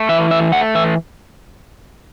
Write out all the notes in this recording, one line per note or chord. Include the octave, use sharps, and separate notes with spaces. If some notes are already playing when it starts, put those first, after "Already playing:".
Already playing: A3
E3 E5
A3 E5
A3 F#5
E3 E5